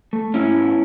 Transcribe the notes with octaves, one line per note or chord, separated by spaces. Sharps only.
A3
G#2 C#4 E4
B3